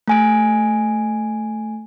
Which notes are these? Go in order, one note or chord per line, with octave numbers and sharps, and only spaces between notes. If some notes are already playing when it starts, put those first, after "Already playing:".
A3 G#5 D7